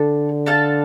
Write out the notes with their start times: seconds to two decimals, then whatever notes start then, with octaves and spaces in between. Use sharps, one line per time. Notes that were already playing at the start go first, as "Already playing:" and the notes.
Already playing: D3 D4 A4
0.46 D4 A4 F5 A5